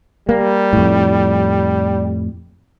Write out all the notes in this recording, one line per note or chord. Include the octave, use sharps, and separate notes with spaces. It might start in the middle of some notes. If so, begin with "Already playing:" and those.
G3 A#3
F2 A2